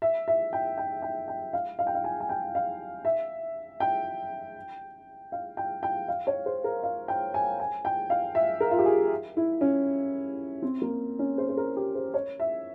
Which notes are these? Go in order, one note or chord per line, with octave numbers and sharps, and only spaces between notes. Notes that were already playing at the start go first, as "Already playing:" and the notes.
E5
E5
G5
G5
G5
G5
F5
F5
G5
F5
G#5
G#5
G5
F5
E5
G5
F5
G5
G5
F5
C#5
C5
A#4
F5
G5
G#5
G#5
G5
F5
E5
A#4
F4
G4
G#4
E4
C#4
C4
A#3
C#4
C5
C5
A#4
G4
C5
C#5
E5